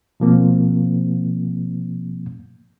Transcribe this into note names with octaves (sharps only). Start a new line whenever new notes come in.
B2 F3 A#3 C4